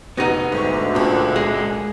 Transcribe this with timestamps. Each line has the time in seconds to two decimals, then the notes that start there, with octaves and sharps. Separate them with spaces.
0.17 F1 B3 D#4 F#4 A#6
0.52 D2 G#2 C#6
0.95 C#2 A#2
1.36 G#3